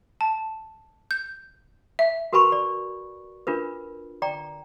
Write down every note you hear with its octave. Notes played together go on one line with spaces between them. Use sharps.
A5
G6
E5
F#4 A#4 B4 G#5 B5 C#6
D5
D4 F4 A#4 B4
D5 G5 A#5